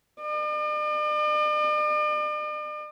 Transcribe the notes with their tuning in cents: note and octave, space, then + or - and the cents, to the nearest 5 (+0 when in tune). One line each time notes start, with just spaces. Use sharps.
D5 +45